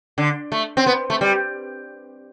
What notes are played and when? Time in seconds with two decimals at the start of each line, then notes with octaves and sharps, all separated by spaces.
0.18 D3
0.52 A3
0.77 C4
0.86 B3
1.10 A3
1.21 G3